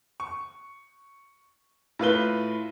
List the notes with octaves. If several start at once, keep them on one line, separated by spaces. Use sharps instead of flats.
C#6
A2 F4 B4 G7